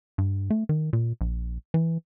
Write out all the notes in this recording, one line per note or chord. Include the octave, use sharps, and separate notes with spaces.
G2
A3
D#3
A#2
A#1
E3